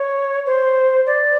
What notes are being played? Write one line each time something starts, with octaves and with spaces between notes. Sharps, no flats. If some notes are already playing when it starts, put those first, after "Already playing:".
Already playing: C#5
C5
D5